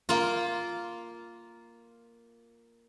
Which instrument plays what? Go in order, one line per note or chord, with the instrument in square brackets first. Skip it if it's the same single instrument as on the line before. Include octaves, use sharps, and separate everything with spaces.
[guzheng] A#3 F4